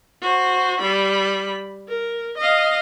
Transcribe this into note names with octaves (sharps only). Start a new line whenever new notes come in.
F#4 C5
G3 B5
A#4
D#5 F5